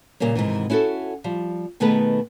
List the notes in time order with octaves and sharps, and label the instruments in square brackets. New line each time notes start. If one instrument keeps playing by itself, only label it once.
[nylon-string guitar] A#2 C#3 G3 A#3 C#4
G#2 C3 D#3 E3
C#4 E4 F#4 G#4 A4
F3 G3
B2 D#3 A3 B3 G#4 B4